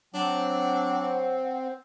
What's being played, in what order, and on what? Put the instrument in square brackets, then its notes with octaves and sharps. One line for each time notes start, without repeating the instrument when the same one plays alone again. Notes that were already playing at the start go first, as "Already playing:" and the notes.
[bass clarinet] F#3 [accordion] C4 [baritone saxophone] D4 [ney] F#5